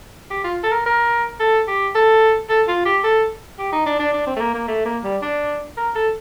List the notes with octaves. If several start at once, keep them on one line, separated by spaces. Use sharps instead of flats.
G4
F4
A4
A#4
A#4
A4
G4
A4
A4
F4
G4
A4
G4
D#4
D4
D4
D4
C4
A3
A#3
A#3
A3
A#3
G3
D4
A#4
A4